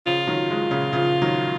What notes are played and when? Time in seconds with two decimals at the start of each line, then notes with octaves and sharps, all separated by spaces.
0.06 C#3 F3 F4
0.27 D#3 F#3
0.49 F3 G#3
0.71 A#2 C#3
0.93 C#3 F3
1.22 D#3 F#3